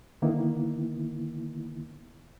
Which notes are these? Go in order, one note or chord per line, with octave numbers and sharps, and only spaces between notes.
D3 D#3 A#3 B3 D#4 E4